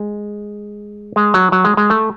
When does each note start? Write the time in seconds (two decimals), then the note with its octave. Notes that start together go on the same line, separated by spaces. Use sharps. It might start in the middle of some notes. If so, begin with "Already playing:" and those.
Already playing: G#3
1.16 G#3
1.34 F#3
1.52 F#3
1.64 G#3
1.77 G#3
1.90 A3